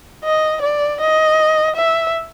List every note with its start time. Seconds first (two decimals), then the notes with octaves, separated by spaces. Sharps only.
0.24 D#5
0.62 D5
1.01 D#5
1.76 E5